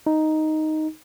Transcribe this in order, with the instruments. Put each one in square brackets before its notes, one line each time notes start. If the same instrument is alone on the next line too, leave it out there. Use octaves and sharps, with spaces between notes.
[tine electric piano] D#4